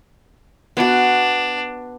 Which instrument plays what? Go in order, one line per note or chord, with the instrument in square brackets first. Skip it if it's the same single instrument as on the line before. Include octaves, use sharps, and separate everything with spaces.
[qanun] B3 F#4 [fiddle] D4